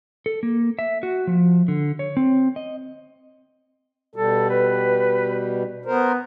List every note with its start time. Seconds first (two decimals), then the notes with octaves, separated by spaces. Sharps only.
0.26 A4
0.43 A#3
0.79 E5
1.03 F#4
1.27 F3
1.68 D3
1.99 C#5
2.17 C4
2.56 D#5
4.16 B2 G3 A4
4.50 B4
5.86 B3 A#4 C5